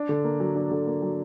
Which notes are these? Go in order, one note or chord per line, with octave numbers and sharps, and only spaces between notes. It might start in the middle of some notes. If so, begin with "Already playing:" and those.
Already playing: D4
D3
A#3
F#3
D4
D3
A#3
F#3